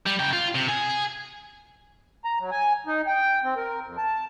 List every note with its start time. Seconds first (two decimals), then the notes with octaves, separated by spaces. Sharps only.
0.06 G3
0.19 C#3 G5
0.33 F4
0.55 C3
0.69 G#4 G#5
2.25 A#5
2.40 F#3
2.51 G#5
2.87 D#4
3.07 G5
3.44 C4
3.56 A#4
3.83 F2
3.97 A5